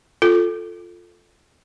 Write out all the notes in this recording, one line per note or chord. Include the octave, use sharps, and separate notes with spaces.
F4 A4